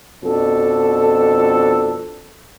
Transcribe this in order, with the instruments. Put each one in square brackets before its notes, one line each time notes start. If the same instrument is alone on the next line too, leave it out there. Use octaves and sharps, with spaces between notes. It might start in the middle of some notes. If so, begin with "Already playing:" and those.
[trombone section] F2 B2 D4 A4